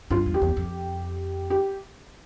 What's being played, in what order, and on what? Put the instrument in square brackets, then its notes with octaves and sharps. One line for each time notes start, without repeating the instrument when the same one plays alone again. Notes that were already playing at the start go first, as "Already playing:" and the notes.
[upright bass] G2 [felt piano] F4
[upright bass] E2
[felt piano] G4
[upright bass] E2
F2
[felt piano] G4